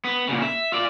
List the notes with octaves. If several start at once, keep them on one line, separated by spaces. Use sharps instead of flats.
B3
A#2 C#3
E5
F4 D5